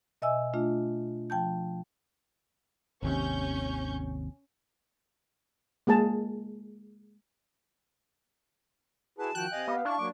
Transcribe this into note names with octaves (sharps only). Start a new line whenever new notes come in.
B2 D#5 E5 G#5 E6
A3 D4 F4
F3 G5 A5 G6
G#1 D#2 C3 C#4 C#6 G6
G#3 A#3 G#4 A5
E4 F#4 G#4 B4 A5
D#3 F3 F#4 G5 F#6
C3 D#5 F5 G#5
B3 G4 F5
D4 E4 C#6
F#3 A#3 D6